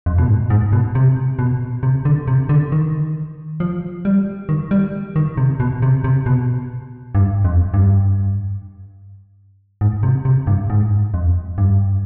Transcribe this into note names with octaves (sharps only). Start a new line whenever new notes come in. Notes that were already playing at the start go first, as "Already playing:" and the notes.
F2
B2
G#2
G#2
B2
C3
B2
C3
D3
C3
D3
D#3
F3
G3
D#3
G3
D#3
C3
B2
C3
C3
B2
G2
F2
G2
G#2
C3
C3
G2
G#2
F2
G2